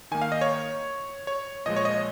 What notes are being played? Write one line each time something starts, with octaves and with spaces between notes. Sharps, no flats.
D#3 A#3 G#5
F5
D#5
C#5
C#5
A#2 F3 G#3 D#5
C#5
D#5